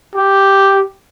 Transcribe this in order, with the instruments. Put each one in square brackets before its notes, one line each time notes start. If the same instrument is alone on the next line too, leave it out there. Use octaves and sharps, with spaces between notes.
[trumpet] G4